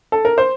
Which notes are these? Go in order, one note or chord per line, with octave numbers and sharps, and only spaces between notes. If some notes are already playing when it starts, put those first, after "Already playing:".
A4
A#4
C5